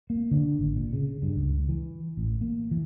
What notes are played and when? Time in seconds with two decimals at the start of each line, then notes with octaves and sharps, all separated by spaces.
0.10 A#3
0.31 D3
0.59 G#1
0.76 A#2
0.93 C#3
1.22 G2
1.36 C#2
1.69 E3
2.17 A1
2.41 A#3
2.71 E3